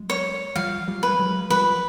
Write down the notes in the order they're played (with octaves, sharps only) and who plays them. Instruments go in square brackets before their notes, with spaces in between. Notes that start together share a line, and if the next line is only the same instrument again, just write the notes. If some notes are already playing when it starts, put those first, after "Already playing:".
Already playing: [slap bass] F#3 G#3
[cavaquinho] C#5
[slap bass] F3 G3 [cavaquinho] F5
[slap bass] F3 G3
[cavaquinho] B4
[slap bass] G3
F#3 G#3
[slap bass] F3 G3 [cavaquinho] B4